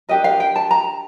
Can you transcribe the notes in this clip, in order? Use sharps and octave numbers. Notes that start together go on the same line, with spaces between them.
D4 G4 A#4 D#5
F5
G5
A5
A#5